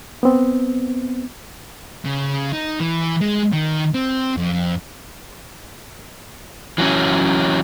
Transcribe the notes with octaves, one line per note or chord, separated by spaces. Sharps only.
B3 C4
C#3
D#4
E3
G#3
D#3
C4
F2
E3 F#3 C#4